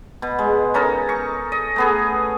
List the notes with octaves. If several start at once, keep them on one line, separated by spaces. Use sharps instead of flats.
B2
G#3
C#4 D#4 A4 A#4
C#6
D#5
A3 B3 G#4